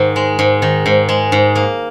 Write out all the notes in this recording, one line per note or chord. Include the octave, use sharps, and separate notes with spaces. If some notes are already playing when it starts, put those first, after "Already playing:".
Already playing: G#2 D#3
G#3
G#2
D#3
G#2
G#3
G#2
A#3